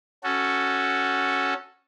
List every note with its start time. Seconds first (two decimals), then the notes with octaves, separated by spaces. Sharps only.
0.24 C#4 F#4 A4